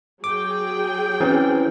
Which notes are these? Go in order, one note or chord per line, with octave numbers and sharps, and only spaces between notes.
F#3 G#4 G5 D6
E3 C4 C#4